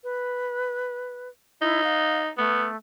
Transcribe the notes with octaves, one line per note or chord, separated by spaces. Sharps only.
B4
D#4 E4
F5
A3 B3